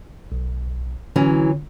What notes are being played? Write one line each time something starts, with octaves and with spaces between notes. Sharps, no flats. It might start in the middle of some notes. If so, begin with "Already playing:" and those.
B1
D3 E3 F#3 C#4